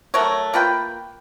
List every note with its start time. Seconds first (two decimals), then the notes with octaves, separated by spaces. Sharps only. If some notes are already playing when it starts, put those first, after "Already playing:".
0.14 F#3 A3 A#4 C#5
0.53 A#3 F4 B4 G5